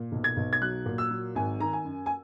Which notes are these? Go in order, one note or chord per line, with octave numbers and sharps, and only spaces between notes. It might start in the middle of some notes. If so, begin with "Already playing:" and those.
Already playing: A#2
B1
G#6
B1
G#6
F#3 F#6
A#2
E6
F#3
G#1 G#5
D#3 A#5
G#5
F#2
G#5